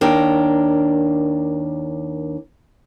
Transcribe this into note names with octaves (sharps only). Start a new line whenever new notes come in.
D#2 D4 A#4 G5